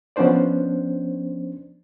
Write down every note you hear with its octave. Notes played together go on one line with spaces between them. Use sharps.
F3 B3 C#4 D4 C5 D5